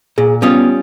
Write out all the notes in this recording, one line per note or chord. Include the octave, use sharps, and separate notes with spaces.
A#2 G#4
G3 B3 C#4 F4 D#6